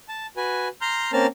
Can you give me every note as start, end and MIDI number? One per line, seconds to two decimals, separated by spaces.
0.09 0.27 81
0.37 0.68 66
0.37 0.68 71
0.37 0.68 80
0.81 1.11 82
0.81 1.11 84
0.81 1.11 89
0.81 1.11 91
1.13 1.27 58
1.13 1.27 60
1.13 1.27 61
1.13 1.27 70
1.13 1.27 81
1.13 1.27 89